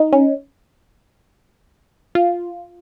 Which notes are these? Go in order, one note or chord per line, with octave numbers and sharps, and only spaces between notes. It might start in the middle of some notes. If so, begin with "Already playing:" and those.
Already playing: D#4
C#4
F4